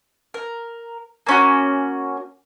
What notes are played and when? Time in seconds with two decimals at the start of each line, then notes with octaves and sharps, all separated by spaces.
0.34 A#4
1.27 A#3 C#4 F#4